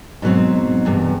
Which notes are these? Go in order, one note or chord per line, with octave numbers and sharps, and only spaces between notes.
G#2 B2 F#3 C4
E2 G2 C3